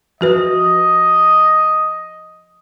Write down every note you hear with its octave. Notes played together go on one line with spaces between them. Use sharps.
F3 F#4 B4 D#5